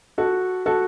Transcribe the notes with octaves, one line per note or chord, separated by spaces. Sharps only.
F#4 A4
F#4 A4